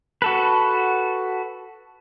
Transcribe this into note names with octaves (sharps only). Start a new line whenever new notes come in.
F#4 A4 B4